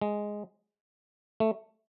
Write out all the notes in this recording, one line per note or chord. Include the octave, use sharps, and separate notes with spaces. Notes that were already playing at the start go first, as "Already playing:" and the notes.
G#3
A3